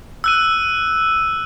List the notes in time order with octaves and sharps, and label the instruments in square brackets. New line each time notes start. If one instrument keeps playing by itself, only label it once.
[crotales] E6 F#6 D#7